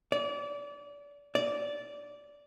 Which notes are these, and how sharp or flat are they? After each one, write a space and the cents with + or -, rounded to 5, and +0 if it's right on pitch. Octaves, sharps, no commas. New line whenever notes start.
D5 -30
D5 -15